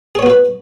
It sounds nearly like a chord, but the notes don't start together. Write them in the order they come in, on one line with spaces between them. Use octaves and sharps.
G#4 C#5 B3 F#4 B4